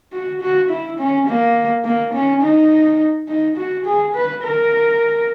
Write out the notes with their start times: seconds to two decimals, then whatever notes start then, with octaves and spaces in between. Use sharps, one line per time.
0.12 F#4
0.41 F#4
0.70 E4
0.98 C#4
1.27 A#3
1.85 A#3
2.13 C#4
2.42 D#4
3.28 D#4
3.57 F#4
3.85 G#4
4.14 B4
4.43 A#4